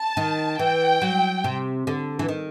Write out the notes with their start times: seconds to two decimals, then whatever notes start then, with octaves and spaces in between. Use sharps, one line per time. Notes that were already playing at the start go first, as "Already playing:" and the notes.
Already playing: A5
0.17 D#3
0.59 E3 G5
1.02 F#3
1.44 C3
1.87 D3
2.19 E3
2.29 D#3